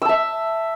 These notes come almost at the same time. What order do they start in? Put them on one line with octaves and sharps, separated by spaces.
E6 A5 E5